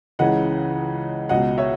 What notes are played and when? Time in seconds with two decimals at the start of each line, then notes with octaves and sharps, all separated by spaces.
0.19 C#2 C#3 E3 D#5 F#5
1.29 C#2 B2 D#5 F#5
1.58 C#5 E5